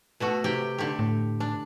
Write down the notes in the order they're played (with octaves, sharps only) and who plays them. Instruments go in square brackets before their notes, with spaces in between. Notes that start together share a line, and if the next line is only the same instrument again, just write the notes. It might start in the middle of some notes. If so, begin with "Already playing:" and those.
[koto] B2 A3 F#4
C3 G4 G5
D3 G4
[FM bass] A2
[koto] D4